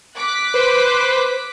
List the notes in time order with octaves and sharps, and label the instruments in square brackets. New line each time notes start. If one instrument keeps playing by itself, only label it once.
[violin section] D6 F#6 B6
[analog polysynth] B4 C5